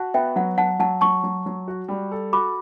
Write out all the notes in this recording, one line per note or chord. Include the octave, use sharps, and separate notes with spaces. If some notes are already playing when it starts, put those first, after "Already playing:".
Already playing: F#4 F#5 A5
B3 E5 G5
F#3 F#5
F#3 F#5 A5
F#3 F#5 A5
F#3 A5 C#6
F#3
F#3
F#4
G3
A4
F#4 B5 D6